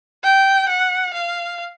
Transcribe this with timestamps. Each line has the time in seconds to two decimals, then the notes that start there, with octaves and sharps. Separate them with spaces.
0.24 G5
0.69 F#5
1.14 F5